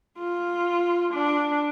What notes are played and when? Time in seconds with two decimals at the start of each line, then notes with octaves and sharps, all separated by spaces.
0.18 F4
1.13 D4